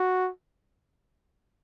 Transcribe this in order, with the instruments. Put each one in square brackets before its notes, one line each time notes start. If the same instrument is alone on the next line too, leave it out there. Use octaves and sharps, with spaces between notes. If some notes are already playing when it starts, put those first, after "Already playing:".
Already playing: [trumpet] F#4